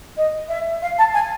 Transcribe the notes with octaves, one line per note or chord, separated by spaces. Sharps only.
D#5
E5
F5
A5
G#5